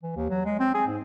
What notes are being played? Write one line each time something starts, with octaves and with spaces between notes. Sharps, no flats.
E3
D#2
F#3
G#3
C4
G#4
G#2